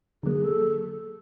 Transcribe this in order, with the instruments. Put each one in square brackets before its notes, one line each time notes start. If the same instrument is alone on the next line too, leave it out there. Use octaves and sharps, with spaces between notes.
[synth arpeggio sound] D3 F#3 A#3 [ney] G#4
[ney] A4